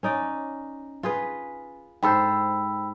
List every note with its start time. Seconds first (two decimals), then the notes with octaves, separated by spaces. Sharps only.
0.03 C#4 D#4 D5
1.03 F4 G#4 B4
2.03 G#2 A4 C5 G5 B5 E6